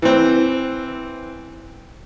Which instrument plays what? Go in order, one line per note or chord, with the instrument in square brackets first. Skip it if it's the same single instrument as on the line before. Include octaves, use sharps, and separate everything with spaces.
[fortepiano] E3 C4